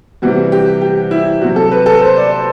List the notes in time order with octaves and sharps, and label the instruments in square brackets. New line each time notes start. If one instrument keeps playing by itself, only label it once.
[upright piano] C3 E3 G3 F#4
G4
G4
E4
C3 F#3 F#4
A4
B4
A4
C5
D5
D5